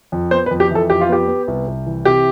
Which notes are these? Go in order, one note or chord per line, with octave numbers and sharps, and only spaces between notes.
F2
B3 C5
B4
F2
G4
E3 A4
F2 G4
F4
B3 G4
B3
C2
C2
E3
C3 G4